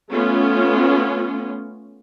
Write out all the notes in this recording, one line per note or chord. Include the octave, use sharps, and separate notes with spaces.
A3 B3 C#4 F4